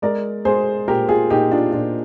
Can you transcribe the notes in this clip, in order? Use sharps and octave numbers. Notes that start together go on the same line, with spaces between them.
G#3 A#4 D5
G#3 G#4 C5
A#2 G4 A#4
F4 G#4
A#2 D#4 G4
D4 F4
A#2 D4